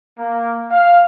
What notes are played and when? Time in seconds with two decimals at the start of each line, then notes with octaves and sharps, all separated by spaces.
0.19 A#3
0.71 F5